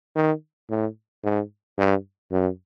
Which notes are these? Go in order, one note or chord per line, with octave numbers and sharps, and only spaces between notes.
D#3
A2
G#2
G2
F#2